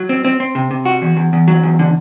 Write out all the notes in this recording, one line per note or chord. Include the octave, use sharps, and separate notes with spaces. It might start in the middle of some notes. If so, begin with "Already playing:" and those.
Already playing: F#3
C4
C4
C4
C3
C3
F#4
E2
E2
E2
F#3
E2
D3